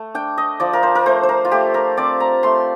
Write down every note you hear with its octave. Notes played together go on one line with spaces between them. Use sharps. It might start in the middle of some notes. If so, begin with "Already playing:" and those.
Already playing: A3
D4 G5
D#5
F3 D5
A#4
C5
A#4
A3 C5
C5
A#4
F4
A3 G4
A#4
C4 D5
A#5
A3 C6